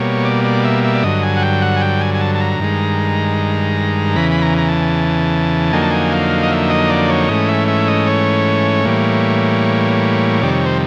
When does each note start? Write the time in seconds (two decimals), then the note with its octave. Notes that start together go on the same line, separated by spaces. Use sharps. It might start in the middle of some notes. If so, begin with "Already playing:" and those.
Already playing: B2 G3 A#3 C#5
0.25 D5
0.44 D5
0.64 E5
0.84 E5
0.94 D5
1.03 G2 D3 F#3 D#5
1.23 G#5
1.37 F#5
1.42 G5
1.62 F#5
1.76 G#5
1.81 G5
2.01 G#5
2.15 G#5
2.21 A5
2.35 A5
2.41 A#5
2.59 G2 D#3 G#3
4.16 E2 C#3 E3 B5
4.31 B5
4.42 A#5
4.58 A#5
4.68 A5
5.73 F2 D3 F#3 A#3 D#4 G#5
5.82 A5
5.91 G#5
6.12 F5
6.43 D#5
6.51 E5
6.70 D#5
6.90 D5
7.10 C#5
7.29 G#2 E3 A3 C#4 D#5
7.48 E5
7.68 E5
7.88 D#5
8.07 C#5
8.85 A2 E3 G3 A#3
10.42 F2 C3 D#3 G3 D5
10.54 C#5
10.66 C5